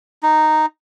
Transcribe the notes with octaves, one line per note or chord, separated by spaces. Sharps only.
D#4